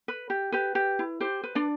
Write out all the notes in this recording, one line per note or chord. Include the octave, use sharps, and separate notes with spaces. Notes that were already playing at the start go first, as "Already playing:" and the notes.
B4
G4
G4 B4
G4
E4
G4 C5
B4
D4 D5